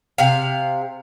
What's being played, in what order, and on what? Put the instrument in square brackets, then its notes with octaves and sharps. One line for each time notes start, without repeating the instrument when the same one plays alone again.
[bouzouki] C3 F5